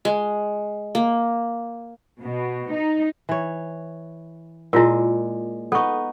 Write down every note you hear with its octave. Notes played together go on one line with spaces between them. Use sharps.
G#3
A#3
B2
D#4
E3 C#5
A#2 G#3 E4 F4 A#4
B3 D#4 A4 C#6